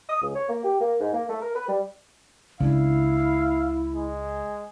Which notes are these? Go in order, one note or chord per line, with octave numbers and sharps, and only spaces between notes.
D#6
C#2
C#5
A#3
G4
A#3
G#2
A#3
A3
A#4
B4
G3
C#2 C#3 D4 E4 F5
G#3